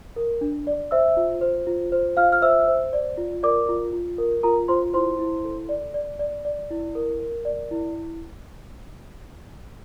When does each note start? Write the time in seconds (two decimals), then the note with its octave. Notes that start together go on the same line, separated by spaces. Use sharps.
0.16 A#4
0.41 D4
0.67 D5
0.91 C5 E5 E6
1.17 F4
1.41 C5
1.67 F4
1.92 C5
2.17 F4 F5 F6
2.32 F6
2.42 C5 E5 E6
2.68 C5
2.93 D5
3.17 F4
3.43 A#4 D5 D6
3.69 F4
3.93 F4
4.18 A#4
4.43 F4 A#4 A#5
4.68 F4 C5 C6
4.94 E4 C5 C6
5.19 E4
5.45 A4
5.69 D5
5.94 D5
6.19 D5
6.45 D5
6.71 E4
6.95 A#4
7.20 A#4
7.45 D5
7.71 E4